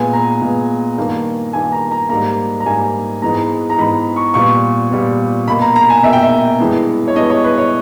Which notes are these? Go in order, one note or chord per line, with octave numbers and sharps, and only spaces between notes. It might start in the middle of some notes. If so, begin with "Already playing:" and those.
Already playing: A#2 G#3 B3 G#5
A#5
A#2 G#3 B3
G2 D#3 A#3
G2 D#3 A#3 G#5
A#5
A#5
G#2 G3 A#3 A#5
A#5
G#2 G3 A#3 G#5
G#2 E3 G#3 B3 A#5
A#5
G#2 E3 G#3 B3 B5
C#6
A#2 G3 B3 C#6
A#2 G3 B3
B2 A#3 B5
A#5
A#5
G#5
B2 A#3 E5
G5
E5
G2 E3 G#3 B3
C#5
G2 E3 G#3 B3 D#5
C#5
B4
C#5